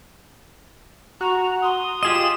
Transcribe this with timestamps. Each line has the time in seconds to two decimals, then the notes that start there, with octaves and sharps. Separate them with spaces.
1.21 F#4 A#5
1.63 C6 D#6
2.03 F4 G4 G#4 D#5 E7